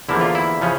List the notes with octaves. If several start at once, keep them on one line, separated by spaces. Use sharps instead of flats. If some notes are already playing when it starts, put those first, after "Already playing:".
E2 D3 F3 A#3 E4
F4
E4
C#3 F3 C#4